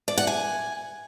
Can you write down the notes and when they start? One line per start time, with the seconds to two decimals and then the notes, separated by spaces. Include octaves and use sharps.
0.08 D5
0.18 F#5
0.27 G#5